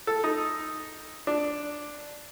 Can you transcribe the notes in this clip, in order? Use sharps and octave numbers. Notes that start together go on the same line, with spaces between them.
A4
D#4
D4